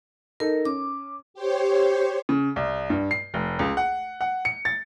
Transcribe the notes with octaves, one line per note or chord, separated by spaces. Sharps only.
D#4 A4 A#4
C#4 D6
G4 C5 C#5
C#3
C2
G2
C7
F1
C#2
F#5
F#5
C#7
A6